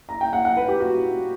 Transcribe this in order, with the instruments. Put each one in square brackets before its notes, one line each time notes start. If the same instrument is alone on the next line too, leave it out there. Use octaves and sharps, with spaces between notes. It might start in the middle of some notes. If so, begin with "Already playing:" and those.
[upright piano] A#5
G5
F#5
F#5
B4
G4
F#4